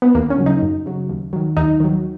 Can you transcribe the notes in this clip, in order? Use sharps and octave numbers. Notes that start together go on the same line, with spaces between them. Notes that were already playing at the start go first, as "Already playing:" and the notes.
B3
D#2 A#3
C#4
C#3 F#3
D#4
F#2
C#3 F#3
D#2
D#3 F#3
D#2 D#4
D#3 F#3